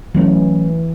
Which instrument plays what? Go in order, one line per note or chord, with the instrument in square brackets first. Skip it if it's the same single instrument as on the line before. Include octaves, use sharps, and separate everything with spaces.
[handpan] E3 [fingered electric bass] F#3 A3 C#4